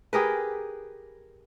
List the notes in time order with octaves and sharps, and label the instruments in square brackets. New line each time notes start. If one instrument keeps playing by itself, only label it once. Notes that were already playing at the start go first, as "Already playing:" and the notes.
[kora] G4 G#4 A#4 B4